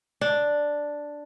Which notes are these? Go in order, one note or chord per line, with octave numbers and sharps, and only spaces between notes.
D4